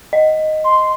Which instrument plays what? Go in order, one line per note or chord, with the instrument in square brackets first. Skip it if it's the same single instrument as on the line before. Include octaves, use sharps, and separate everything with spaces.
[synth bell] D#5
[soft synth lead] C6